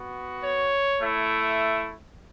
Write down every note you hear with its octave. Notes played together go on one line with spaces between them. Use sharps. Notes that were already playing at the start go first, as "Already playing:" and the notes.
Already playing: B3 F#4
C#5
A3 E4